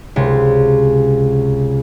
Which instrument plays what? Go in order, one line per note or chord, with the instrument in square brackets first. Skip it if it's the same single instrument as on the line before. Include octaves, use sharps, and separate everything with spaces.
[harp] C#2 C3